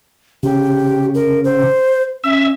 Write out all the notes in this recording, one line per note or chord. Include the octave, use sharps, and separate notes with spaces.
C#3 G4
A#4
C5
C#4 E5